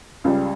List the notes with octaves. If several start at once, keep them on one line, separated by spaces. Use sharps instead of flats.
C#2 C#3 G3